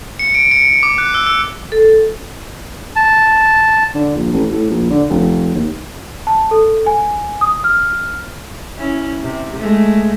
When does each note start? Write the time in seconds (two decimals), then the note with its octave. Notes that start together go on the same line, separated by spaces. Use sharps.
0.19 C#7
0.35 D7
0.51 C#7
0.65 C#7
0.83 D6
0.98 F#6
1.14 E6
1.27 E6
1.72 A4
2.96 A5
3.95 D3
4.16 A#1
4.33 A1
4.51 A2
4.70 A#1
4.90 D3
5.10 F1
5.55 D#2
6.27 A5
6.51 A4
6.86 G#5
7.41 D#6
7.64 F6
8.78 C#4 E4
9.23 C3
9.56 G#3 A3